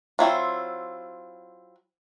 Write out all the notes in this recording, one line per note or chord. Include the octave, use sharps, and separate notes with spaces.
F#3 C4 E4 F4